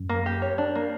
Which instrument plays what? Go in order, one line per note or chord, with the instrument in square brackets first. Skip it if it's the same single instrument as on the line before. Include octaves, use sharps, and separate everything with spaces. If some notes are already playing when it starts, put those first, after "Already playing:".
Already playing: [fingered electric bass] F#2
[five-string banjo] A#3
G4
C#5
D4
A#3